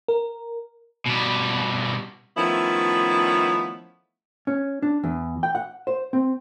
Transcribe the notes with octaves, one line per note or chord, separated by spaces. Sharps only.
A#4
B2 G3
D#3 F3 A3 B3 C#4 E4
C#4
D4
E2
G5
F#5
C5
C4